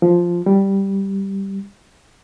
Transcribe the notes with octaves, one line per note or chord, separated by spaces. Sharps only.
F3
G3